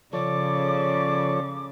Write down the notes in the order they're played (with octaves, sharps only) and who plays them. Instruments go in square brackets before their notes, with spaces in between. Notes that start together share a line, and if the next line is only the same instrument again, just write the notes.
[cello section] C#3 [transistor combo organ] F3 A4 C#5 [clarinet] D5 [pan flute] D6